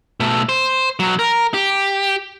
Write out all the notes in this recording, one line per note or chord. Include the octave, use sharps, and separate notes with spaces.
B2 A3
C5
B1 F#3
A#4
G4